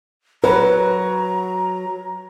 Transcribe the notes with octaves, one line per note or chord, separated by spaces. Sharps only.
F#3 B4 A#5